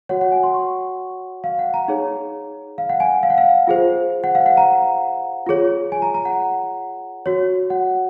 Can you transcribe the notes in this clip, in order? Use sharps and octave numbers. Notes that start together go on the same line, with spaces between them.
F#4 C#5 F#5
F#5
G#5
C6
C#6
F5
F#5
A#5
D#4 G#4 C#5
F5
F#5
G#5
F5
F#5
F5
F4 G#4 C5
F#5
F5
F#5
A#5
F4 G#4 C#5
G#5
A#5
A#5
F#5
F#4 C#5
F#5